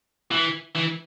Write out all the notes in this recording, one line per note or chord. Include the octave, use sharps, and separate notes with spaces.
E3
E3